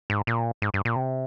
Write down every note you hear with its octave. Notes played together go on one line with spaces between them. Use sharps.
G#2
A#2
G#2
G2
A#2
C3